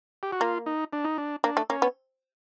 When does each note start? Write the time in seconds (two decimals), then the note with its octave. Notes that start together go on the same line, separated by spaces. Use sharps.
0.23 G4
0.32 F#4
0.40 A#3 F4
0.66 D#4
0.93 D4
1.05 D#4
1.18 D4
1.44 A#3 D4
1.57 A3
1.70 A#3 C#4
1.82 B3